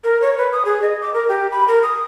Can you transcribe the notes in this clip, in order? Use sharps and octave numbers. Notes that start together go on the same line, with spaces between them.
A#4
C#5
B4
D#6
G#4
D#5
D6
A#4
G4
B5
A#4
D#6